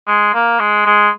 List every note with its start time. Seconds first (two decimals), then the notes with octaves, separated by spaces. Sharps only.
0.07 G#3
0.34 A#3
0.60 G#3
0.86 G#3